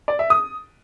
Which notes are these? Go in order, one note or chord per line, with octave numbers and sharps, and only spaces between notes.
D5
E5
D#6